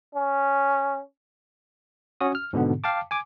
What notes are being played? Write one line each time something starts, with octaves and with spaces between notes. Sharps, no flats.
C#4
C#4 F#4 D#6
F6
G#2 B2 D3 B3
F5 G5 A5 D6
G#5 D6